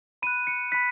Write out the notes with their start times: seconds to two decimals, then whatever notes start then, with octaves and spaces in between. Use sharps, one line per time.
0.22 B5 D#7
0.27 F#6
0.47 C#7
0.72 B5 F#6 B6